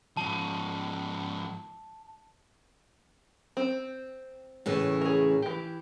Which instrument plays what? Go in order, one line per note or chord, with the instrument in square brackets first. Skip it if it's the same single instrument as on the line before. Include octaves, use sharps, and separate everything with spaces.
[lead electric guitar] G#2 F3 [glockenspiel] A5
[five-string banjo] C4
[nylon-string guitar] A2 C#3 E3
[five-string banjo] G#4 A#4
E3 G4